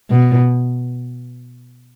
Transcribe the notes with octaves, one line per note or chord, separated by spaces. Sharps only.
B2